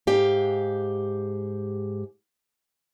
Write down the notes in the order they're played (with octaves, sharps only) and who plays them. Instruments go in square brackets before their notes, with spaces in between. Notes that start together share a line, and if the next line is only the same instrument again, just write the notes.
[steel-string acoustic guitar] G#2 G4 F5